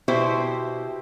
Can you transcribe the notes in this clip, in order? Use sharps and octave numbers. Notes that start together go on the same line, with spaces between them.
B2 E4 G4 C5